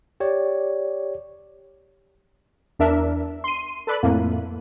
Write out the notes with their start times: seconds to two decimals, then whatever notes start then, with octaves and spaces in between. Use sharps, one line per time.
0.20 G4 C#5 D5
2.79 E2 D4 A#4 E5
3.44 C6 D#7
3.87 A4 B4 D5 B5
4.03 F2 A2 A3 A#3